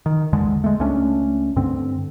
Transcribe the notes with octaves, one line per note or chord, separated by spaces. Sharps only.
D#3
A#1 E2 D3 G#3
G#3 A3
C#2 A3 C#4 D4
G2 D3 C4